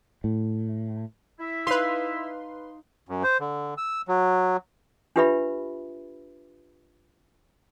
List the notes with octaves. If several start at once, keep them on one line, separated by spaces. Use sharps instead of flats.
A2
E4 E5
D#4 B4 F5 C6
F#2
C5
D3
E6
F#3
D4 F4 G4 B4 E5 B5